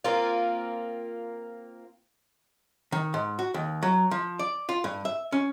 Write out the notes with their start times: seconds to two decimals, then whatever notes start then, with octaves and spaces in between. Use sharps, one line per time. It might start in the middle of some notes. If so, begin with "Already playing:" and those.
0.04 A#3 C4 F4
2.92 D#3
3.14 G#2
3.39 F#4
3.54 D#2
3.83 F#3
4.11 F3
4.39 D5
4.69 F4
4.84 G2
5.05 E5
5.32 C#4